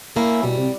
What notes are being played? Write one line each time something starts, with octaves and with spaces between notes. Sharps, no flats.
A#3 C#4 E4
B2 G3
C3